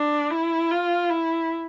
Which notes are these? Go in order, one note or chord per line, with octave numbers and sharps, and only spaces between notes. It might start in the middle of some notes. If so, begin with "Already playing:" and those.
Already playing: D4
E4
F4
E4